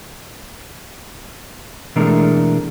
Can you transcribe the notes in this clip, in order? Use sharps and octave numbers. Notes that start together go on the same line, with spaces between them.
B2 E3 G#3 A3 D4 A#4